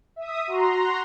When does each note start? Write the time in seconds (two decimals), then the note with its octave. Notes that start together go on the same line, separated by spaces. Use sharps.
0.16 E5 D#6
0.47 F#4 A#5 C6